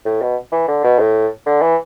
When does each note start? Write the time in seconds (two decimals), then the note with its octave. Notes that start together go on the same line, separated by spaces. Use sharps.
0.05 A2
0.22 B2
0.52 E3
0.68 D3
0.84 B2
0.99 A2
1.46 D3
1.62 E3